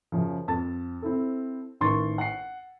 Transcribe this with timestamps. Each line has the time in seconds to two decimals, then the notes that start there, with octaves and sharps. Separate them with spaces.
0.12 F#2 C#3 F3
0.48 F2 A5 A6
1.02 C4 E4 A4
1.81 A1 D#3 A#4 C6 C#6 A6
2.18 F#5 C7